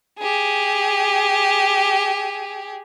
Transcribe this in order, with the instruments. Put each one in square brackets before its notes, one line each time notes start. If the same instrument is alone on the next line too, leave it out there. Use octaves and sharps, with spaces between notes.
[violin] G4 G#4